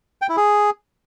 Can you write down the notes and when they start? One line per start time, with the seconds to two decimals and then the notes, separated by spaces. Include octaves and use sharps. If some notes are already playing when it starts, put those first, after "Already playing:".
0.22 G5
0.29 E4
0.37 G#4